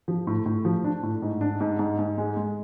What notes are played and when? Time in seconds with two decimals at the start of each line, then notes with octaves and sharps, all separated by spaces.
0.08 F3
0.27 A2
0.46 A2
0.65 F3
0.84 D4
1.03 A2
1.22 G#2
1.41 D4
1.60 G#2
1.79 G#2
1.99 G#2
2.18 G#3
2.37 G#3